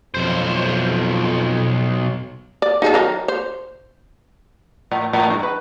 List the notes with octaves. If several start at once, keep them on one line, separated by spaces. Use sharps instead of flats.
B1 F2 C5
D5
D#4 G#4 A4
D#3 F#3 A#4
C5
A2
A2
G2
B4